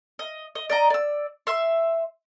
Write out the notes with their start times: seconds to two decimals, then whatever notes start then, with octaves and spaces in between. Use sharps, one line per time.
0.19 D#5
0.55 D#5
0.70 D5 D#5 A#5
0.90 D5 E6
1.47 E5 C6